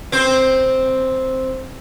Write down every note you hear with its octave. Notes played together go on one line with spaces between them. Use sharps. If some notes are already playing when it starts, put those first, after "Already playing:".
C4 C5